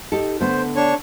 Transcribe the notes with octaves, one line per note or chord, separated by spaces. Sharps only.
D#4 G4 A4
D3 A3 B3 C5
D4 C#5 C#6